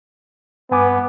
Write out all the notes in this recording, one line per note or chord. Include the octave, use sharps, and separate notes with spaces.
G2 B3 G#5 D6